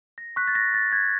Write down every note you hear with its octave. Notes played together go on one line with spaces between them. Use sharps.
A#6
C#6 F#6 B6
A6
A#6
A6
G#6